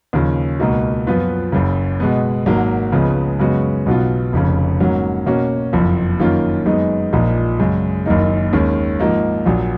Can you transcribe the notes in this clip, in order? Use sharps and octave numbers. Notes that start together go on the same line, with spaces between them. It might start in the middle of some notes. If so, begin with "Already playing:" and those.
D#2 C#3 F3
C#2 B2 A#3 D#4 F#4
F#2 F3 B3 F4 B4
F#1 F#2 C#3
B2 G#3 B3
G#1 G#2 F#3 A#3
C#2 C#3 F3 G#3 B3
F#2 C#3 G#3 B3 F#4
B1 B2 F#3 B3 F4
F1 F2 C#3
G#2 F#3 A#3 C#4
B2 A#3 C#4 F#4
F#1 F2 F3
F#2 D#3 A#3 C#4 F4
F#2 D#3 G#3 B3 D#4
A#1 A#2 F3 A#3 D#4
F#2 C#3 G#3
F#1 F#2 D#3 A#3 D#4
D#2 D#3 G#3 C#4
G#2 F3 A#3 D#4
A#1 A#2 F#3